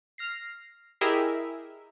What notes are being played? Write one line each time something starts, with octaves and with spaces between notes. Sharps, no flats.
F6 A#6 C7
E4 G4 G#4 A#4 D#5 E5